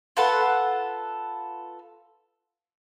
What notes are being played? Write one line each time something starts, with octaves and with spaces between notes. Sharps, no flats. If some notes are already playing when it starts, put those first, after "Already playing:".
F4 A4 B4 F#5